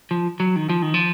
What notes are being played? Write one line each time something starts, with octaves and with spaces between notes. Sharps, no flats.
F3
F#3
D#3
F3
D#3
F3